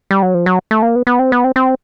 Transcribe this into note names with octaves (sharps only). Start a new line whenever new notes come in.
G3
F#3
F3
F#3
A3
A#3
B3
B3
C4
B3
C4
C4